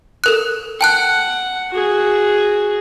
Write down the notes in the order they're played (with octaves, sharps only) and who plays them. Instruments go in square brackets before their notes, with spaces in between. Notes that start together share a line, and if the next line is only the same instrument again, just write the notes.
[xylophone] A4 A#4 F#6
[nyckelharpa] F#5 [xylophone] G5 A5 F#6
[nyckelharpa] F#4 G#4